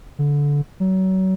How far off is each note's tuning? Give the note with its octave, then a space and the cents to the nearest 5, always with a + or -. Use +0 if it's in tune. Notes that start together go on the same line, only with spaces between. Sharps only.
D3 -20
F#3 +30